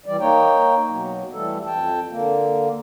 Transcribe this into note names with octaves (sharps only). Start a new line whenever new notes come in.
E3 G3 D5
A#3 D#4 C#5 G5
B2 F#3
E3 G3 A3 A4
F2 G5 A5
D3 A#3